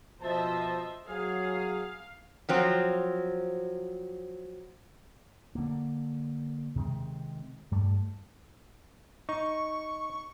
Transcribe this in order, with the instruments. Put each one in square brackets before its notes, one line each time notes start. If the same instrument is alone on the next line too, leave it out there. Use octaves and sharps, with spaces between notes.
[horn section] B2 F3 A5 [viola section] C5 D#5 E5
[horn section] F#3 G#4 [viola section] F5
[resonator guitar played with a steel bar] F3 F#3 C4
[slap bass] D3 A#3
C3 D#3 G#3 C4
G2 G3 A3
[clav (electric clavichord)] D#4 [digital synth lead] C#6